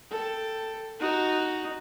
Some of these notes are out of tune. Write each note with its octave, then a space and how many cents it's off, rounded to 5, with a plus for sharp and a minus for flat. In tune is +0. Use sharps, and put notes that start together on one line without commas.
A4 +10 G5 +0
D#4 +0 F#4 +0